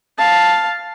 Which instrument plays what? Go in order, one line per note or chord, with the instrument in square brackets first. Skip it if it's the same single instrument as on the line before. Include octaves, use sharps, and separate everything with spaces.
[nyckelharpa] F5 A5